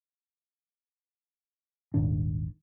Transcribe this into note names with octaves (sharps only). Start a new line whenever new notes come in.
D#1 G#1 D#3 D4